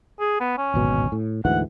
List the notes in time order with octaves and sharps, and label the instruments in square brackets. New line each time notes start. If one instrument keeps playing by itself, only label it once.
[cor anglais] G#4
B3
C#4
[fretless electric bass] D1 G#1 B2
A2
[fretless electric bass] D2 G#2 E3 [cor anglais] F#5